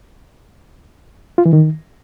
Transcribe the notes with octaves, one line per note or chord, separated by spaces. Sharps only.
F4
E3
D#3